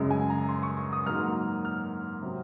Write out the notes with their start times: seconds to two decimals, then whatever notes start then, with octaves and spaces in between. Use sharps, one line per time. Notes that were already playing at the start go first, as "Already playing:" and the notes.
Already playing: F#2 C#3 G#3
0.11 G#5
0.30 A#5
0.49 C6
0.63 C#6
0.77 C#6
0.93 D#6
1.06 G#2 F#3 A#3 F6
1.65 F6
2.22 C3 F#3 C4